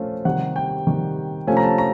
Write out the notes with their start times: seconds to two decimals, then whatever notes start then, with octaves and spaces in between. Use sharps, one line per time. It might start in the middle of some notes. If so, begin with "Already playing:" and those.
Already playing: F3 A3 C#4 F4
0.25 C3 D#3 G3 F#5
0.56 G5
0.87 C3 D#3 G3
1.47 C3 F3 A3 C#4 F4 G#5
1.57 A#5
1.63 A5
1.78 A#5